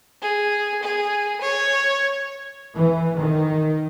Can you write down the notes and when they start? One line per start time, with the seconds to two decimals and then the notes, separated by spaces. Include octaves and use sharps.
0.22 G#4
0.83 G#4
1.41 C#5
2.74 E3
3.17 D#3